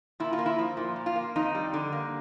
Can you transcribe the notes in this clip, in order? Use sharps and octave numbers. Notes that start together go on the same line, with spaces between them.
A#2 E4
F4
A#3
E4
F3
A#2
A#2
F4
A#3
F2 D#4
G3
D3
A#3